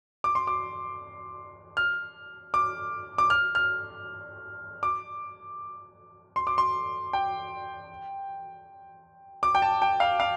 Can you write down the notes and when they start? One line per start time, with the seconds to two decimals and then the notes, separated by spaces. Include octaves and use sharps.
0.24 D6
0.35 C6
0.47 D6
1.77 F6
2.54 D6
3.18 D6
3.30 F6
3.55 F6
4.83 D6
6.36 C6
6.47 D6
6.58 C6
7.13 G5
9.43 D6
9.55 G5
9.62 A5
9.82 G5
10.00 F5
10.20 F5